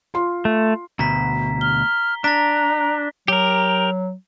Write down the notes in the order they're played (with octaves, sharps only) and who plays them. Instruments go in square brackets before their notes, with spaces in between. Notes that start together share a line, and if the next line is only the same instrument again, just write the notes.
[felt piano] F4 C6
[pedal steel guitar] A3
[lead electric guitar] D2 B2 [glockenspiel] A#5 B6
[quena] F6 [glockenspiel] G7
[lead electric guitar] D4 [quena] A#5 [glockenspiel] A#6 B6
[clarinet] F#3 [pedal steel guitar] G4 A#4